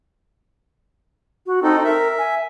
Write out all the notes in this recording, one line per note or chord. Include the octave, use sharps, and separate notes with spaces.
F#4
C4 D#4 A4
A#4 E5
G#5